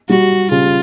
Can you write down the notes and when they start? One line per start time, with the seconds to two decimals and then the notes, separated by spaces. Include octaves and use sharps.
0.09 G3 F#4
0.50 C#3 F4